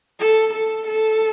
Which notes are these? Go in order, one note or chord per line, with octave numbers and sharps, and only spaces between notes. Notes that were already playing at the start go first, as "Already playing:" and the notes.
A4
A4
A4